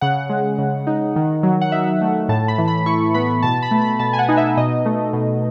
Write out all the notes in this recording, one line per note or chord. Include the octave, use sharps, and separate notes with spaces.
C#3 F#5
G#3
C#3
D#4
D#3
F#3
F#5
D#4 E5
A3
A2 A5
B5
E3
B5
E4 C#6
B3 B5
B2 A5
B5
A3
B5
B2 A5
G#5
F#5
D#4
E5
B2 D#5
A3
B2